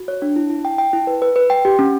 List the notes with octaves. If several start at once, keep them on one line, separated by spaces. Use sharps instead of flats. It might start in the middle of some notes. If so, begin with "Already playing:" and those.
Already playing: F#4
C#5
D4
E4
E4
G5
G5
E4
B4
B4
B4
G5
G4
C#4